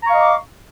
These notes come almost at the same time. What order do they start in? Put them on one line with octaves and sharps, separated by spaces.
A#5 C#6 F5 D#5 D6